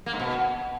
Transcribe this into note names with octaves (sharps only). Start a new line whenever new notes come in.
A#3
G#2
B2